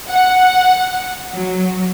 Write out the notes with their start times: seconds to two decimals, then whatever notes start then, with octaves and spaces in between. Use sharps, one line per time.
0.10 F#5
1.33 F#3